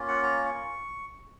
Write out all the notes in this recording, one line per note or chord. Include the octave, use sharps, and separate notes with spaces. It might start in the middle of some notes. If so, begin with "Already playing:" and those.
Already playing: A#3 C#4 F4
F#5
A#5
C#6